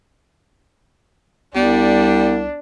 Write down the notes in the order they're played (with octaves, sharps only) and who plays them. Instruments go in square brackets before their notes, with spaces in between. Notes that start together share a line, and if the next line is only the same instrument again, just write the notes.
[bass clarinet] C2 [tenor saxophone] G3 [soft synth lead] B3 [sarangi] D4